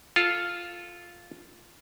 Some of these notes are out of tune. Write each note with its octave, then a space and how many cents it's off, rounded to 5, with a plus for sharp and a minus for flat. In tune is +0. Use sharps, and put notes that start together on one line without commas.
F4 +0 A4 +0